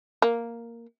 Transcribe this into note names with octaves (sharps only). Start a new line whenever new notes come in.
A#3